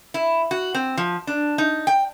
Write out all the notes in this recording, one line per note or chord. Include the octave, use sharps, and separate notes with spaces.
E4
F#4
C4
F3
D4
D#4
G5